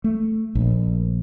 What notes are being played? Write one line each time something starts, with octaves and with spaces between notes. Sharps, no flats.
A3
A#1